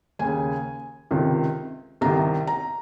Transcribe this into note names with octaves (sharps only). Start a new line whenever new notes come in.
D#2 C#3 G#5
C#2 C3 D#3
C2 C3 D#3 A#5
A#5